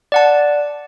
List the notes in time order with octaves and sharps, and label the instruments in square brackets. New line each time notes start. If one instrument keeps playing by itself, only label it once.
[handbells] D5 F#5 A5